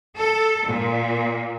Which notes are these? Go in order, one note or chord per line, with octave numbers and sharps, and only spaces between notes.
A4
A#2